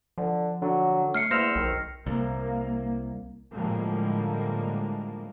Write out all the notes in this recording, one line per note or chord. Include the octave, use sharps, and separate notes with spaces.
D3 F3
D3 F#3
A3 F6 C7 C#7
E2 A#3 C5 E6 F6 A#6
B1 D#3
C2 A#3
A2 D3 F3 G3 G#3 A#3